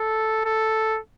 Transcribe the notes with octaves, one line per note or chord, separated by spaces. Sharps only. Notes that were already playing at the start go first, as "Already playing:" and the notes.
Already playing: A4
A4